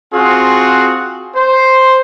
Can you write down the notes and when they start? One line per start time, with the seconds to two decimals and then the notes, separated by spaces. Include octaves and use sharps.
0.13 C4 F4 F#4 G#4
1.36 C5